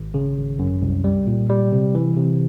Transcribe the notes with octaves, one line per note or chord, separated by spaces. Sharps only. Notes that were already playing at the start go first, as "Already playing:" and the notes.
Already playing: G#1
C#3
G#1
F#2
C2
G3
A#2
G3
C3
E3
C3